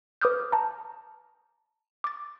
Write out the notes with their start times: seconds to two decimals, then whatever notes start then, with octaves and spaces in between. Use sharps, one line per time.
0.21 B4 D6 D#6 F6 G6
0.52 A5 A#5
2.04 D6 A6